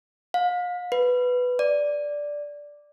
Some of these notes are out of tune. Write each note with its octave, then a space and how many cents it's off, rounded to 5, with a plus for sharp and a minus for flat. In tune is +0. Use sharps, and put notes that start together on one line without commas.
F5 +35
B4 +5
D5 -5